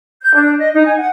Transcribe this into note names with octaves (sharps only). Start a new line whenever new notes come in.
G6
D4
D#5
D#4
G#5
F#5